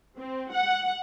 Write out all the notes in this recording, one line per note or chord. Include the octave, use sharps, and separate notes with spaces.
C4
F#5